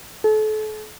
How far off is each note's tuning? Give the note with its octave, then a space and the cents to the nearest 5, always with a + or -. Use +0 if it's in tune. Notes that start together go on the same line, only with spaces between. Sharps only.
A4 -35